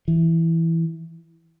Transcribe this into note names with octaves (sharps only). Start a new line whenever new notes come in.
E3